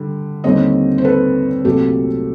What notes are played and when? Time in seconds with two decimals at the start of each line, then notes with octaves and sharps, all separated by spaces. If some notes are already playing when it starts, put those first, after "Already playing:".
Already playing: D3 G3
0.44 D#2 D3 G3 C4 C#5 D#5
0.98 C5
1.05 A4 B4
1.65 C2 A#2 F#3 A3 G4 A4